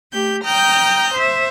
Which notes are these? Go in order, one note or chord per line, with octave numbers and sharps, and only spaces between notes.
A3 G4 G6
G5 A#5 D#6 F6 G6
C5 E5